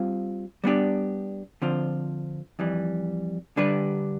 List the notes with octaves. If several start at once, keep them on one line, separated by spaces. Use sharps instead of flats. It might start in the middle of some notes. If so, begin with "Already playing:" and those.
Already playing: G3 C4 F4 F5
G3 B3 D4 G4
D3 F3 C4 F4 C5
F2 E3 G3
D3 G3 D4 G4 B4